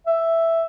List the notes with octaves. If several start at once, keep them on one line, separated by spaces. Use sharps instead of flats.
E5